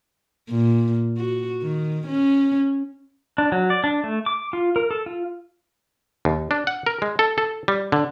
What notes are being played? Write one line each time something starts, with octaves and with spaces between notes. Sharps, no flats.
A#2
F#4
D#3
C#4
D4
F#3
D5
D4
A3
D6
F4
A#4
A4
F4
D#2
D4
F#5
A#4
G#3
A4
A4
G3
D3